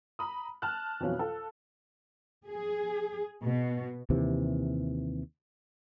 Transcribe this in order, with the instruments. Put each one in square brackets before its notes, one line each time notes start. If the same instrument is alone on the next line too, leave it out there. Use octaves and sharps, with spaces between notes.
[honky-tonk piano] A#5 B5 D#6
A5 F6 F#6
F2 B2 E3 F#3 C#4 F4
F4 A4
[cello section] G#4
B2
[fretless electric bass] D#2 C3 E3